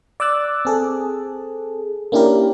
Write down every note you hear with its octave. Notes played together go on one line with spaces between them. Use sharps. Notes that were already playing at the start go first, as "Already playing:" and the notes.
D5 D6 E6 F#6 A6
C4 G#4 A4
A#3 C#4 D4 E4 G4 A#4